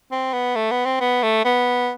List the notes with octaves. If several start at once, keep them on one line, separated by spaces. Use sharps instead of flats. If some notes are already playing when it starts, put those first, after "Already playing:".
C4
B3
A3
B3
C4
B3
A3
B3